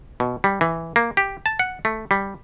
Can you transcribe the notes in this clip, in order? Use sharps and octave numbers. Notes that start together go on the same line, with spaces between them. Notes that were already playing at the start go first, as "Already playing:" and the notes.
B2
G3
E3
A#3
G4
A5
F#5
A3
G3